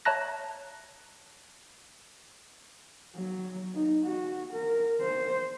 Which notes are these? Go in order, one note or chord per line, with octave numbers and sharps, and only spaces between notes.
C#5 E5 A5 A#5 F#6 A#6
F#3
D#4
F#4
A#4
C5